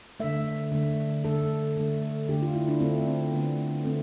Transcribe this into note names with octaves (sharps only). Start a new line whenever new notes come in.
D3 A3 E5
D3 A3
D3 A3 A4
D3 A3
D3 A3 G4
F4
E4
D4
D3 A3 C4
C4
D3 A3 B3
D3 A3 C4